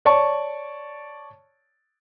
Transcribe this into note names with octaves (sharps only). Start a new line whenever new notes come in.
C#5 D5 A5 C#6